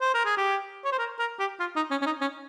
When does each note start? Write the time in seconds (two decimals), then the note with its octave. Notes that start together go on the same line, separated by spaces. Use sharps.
0.01 C5
0.14 A#4
0.26 G#4
0.37 G4
0.85 C#5
0.92 C5
0.99 A#4
1.19 A#4
1.40 G4
1.60 F4
1.76 D#4
1.91 C#4
2.02 C#4
2.06 D#4
2.21 C#4